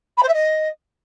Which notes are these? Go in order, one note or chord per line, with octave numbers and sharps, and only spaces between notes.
B5
C5
E5
D#5